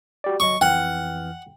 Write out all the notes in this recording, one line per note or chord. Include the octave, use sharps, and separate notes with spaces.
F#4 G4 D5
G#1 F#3 D#5 C#6
F2 E3 F#5 G5 F6